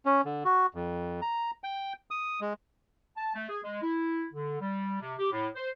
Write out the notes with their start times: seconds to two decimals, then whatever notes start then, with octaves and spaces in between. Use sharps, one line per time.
0.05 C#4
0.25 D3
0.45 F#4
0.75 F2
1.22 A#5
1.64 G5
2.11 D#6
2.41 G#3
3.17 A5
3.35 A3
3.49 G#4
3.63 G#3
3.82 E4
4.33 D3
4.60 G3
5.01 C3
5.18 G4
5.31 A2
5.55 C5